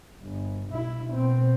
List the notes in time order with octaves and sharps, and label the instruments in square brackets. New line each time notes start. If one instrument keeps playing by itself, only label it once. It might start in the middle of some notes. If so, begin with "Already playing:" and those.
[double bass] G1
B1 E4
B2 C4